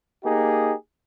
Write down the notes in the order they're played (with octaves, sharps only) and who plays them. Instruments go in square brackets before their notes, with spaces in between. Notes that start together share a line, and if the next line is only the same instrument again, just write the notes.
[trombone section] A#3 D#4 G4 G#4